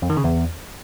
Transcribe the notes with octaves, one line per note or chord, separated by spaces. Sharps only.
F2
D#3
C#3
E2